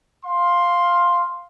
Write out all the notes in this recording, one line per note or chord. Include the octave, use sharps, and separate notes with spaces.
F5 C6